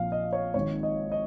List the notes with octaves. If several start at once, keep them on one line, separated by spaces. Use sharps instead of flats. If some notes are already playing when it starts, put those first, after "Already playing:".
Already playing: A#1 A#2 F3 F5
D#5
C#5
G#1 G#2 D#3 C#5
D#5
D#5